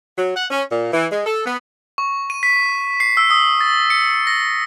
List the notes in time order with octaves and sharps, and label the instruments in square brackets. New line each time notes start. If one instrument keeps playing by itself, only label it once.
[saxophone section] F#3
F#5
C#4
A#2
E3
G#3
A4
B3
[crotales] C#6
D#7
B6
C7
E6
D#6
A6
C#7
A#6